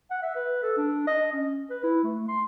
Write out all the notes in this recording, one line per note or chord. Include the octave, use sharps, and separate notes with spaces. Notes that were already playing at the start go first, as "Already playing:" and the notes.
F#5
E5
B4
A4
D4
D#5
C#4
B4
E4
A3
C6